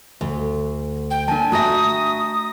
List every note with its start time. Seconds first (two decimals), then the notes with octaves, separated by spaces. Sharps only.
0.21 D2
1.10 G5
1.28 A#3 D4 G#5 A5
1.52 A3 F#4 E5 A#5 D#6 A#6